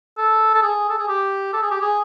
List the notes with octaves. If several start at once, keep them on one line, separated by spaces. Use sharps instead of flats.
A4
A4
G#4
A4
G#4
G4
A4
G#4
G4
G#4